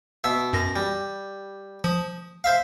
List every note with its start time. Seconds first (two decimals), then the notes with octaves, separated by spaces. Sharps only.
0.24 B2 E5 E6
0.53 F#2 A#6
0.76 G3
1.84 F3 D#6
2.44 C5 E5 F5